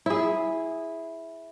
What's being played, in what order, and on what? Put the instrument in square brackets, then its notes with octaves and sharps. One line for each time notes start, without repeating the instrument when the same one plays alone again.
[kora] E4 G#4